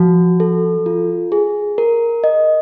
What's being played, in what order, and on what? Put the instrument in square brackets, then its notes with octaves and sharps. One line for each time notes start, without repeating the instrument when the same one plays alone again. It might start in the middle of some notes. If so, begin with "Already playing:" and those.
Already playing: [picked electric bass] F3 [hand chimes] F#4
[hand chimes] A4
F4
G#4
A#4
D#5